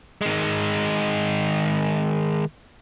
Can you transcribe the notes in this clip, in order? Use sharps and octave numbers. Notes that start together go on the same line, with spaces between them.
D#3 G#3